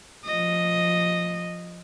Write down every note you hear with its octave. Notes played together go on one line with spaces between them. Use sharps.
F3 D#5